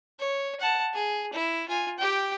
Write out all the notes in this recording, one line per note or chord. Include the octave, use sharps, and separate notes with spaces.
C#5
F#5 A5
G#4
E4
F4 G#5
G4 G5